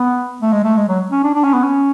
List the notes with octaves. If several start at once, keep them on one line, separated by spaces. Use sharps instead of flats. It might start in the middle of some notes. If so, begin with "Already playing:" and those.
Already playing: B3
A3
G#3
A3
G#3
F#3
C#4
D4
D4
C#4
B3
C#4